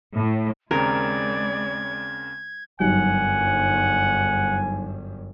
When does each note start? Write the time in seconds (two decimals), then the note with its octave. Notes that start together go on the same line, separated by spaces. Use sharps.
0.15 A2
0.71 D#2 C#3 G#3 C4 A#4 D5 G#6
2.80 G1 F#2 F#3 G3 D#4 F#5 G#5